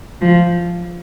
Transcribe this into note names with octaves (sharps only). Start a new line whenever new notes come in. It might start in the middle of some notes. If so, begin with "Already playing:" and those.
F3